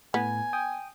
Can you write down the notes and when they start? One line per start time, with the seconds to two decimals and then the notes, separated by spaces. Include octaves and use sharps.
0.14 A2 B3 G#5
0.53 G5 D#6